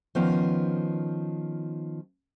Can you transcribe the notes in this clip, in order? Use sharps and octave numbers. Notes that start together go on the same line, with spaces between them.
D#3 F3 B3 C#4